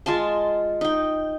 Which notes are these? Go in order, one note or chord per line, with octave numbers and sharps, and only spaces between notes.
G#3 F4 G#5 A5
D#4 G5